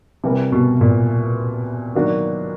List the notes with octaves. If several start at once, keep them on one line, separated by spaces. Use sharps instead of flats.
C3 E3 G3 A#3
B2
A#2
D#3 F#3 A#3 D4 F#4